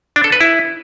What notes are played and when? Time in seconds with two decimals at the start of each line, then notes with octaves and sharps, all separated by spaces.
0.16 D4
0.24 A4
0.32 B4
0.41 E4